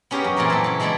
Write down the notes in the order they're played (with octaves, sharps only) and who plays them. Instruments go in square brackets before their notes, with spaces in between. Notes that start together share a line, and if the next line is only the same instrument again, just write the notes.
[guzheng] B3 C#4 G4 G#4 A#4 C#5
F#2
A#2 E3 F#3 C4 A#4
A4 E5
C#3 A4
E3 G#3 B3 B4 D5 E5